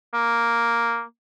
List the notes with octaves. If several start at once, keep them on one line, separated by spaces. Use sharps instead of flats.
A#3